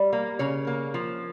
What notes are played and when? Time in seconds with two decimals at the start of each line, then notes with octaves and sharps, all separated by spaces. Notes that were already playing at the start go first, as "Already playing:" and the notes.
Already playing: G3
0.13 A#3
0.39 C#3 C#5
0.67 A#3
0.94 F3